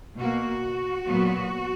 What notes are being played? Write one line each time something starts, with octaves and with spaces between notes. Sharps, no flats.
B2 A#3 F#4
A#2 F#3 B3